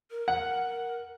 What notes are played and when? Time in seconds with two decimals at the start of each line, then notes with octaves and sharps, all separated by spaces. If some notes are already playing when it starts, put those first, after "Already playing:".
0.11 A#4
0.28 F#5